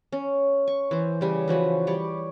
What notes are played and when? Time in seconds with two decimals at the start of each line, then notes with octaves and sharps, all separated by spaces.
0.12 C#4
0.68 C#6
0.91 E3 C5
1.21 C#3 G3 G#5
1.48 E3 F3 F#4 B4
1.87 G3 C#5 D5